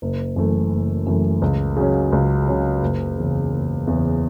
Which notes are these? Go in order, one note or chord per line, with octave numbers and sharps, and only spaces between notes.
F#1
F#2 E3 A3
F#1
F#2 E3 A3
C#2
C#3 F#3 C#4
C#2
C#3 F#3 C#4
F#1
E2 C#3
F#1
E2 C#3